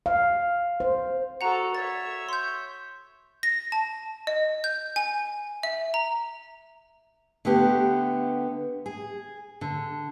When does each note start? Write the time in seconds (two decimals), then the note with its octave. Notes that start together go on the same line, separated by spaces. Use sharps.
0.06 F5
0.80 C5
1.41 F#4 A4 F#5 A#5
1.75 C#5 E5 A6
2.29 C6 G6
3.43 A#6
3.72 A5
4.27 D#5
4.64 G6
4.96 G#5
5.63 E5
5.94 A#5
7.45 D3 A3 B3 G4
8.86 G#4
9.61 D3